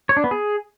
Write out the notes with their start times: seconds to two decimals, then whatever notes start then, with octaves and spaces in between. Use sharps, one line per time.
0.09 C#5
0.17 D4
0.24 B3
0.31 G#4